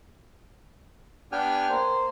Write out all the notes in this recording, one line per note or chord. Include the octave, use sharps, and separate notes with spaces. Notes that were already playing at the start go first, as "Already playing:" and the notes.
B3 D4 G4 G5 G#5 F6
A#3 C5